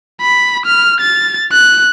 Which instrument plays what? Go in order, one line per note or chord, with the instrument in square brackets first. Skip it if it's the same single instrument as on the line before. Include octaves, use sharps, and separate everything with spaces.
[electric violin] B5
F6
A6
F#6